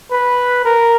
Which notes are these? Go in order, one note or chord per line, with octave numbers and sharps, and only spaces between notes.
B4
A#4